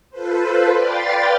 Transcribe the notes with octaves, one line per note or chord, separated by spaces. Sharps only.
F4 A4 B4 C5
B4 D5 F5 G5 C6 A6